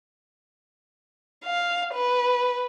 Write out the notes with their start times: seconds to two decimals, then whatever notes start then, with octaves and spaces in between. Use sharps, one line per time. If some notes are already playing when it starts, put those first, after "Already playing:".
1.45 F5
1.94 B4